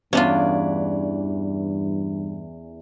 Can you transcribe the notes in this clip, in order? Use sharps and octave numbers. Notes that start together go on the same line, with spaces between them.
E2 G2 E3 C#4 D4 F4 D5